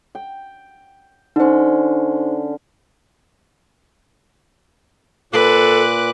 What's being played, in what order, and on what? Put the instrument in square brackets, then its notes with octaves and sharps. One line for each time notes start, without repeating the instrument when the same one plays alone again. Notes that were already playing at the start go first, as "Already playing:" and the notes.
[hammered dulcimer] G5
[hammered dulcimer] D3 C#4 [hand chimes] D#4 C5
[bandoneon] A#2 D6 F#6 [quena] A4 [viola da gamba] B4